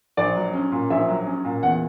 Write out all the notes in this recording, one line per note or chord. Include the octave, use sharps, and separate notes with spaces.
A#1 D5
F#3
C#4
A#2
A#1 E5
F#3
C#4
A#2
E2 F#5